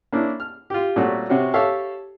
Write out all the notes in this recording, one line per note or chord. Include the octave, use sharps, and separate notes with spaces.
A#3 C#4 D4 E4
F6
F4 G4
A#2 G3 A3 C4 C#4 F#4
C3 C4 C#4 F#4
G4 A4 C#5 E5 F5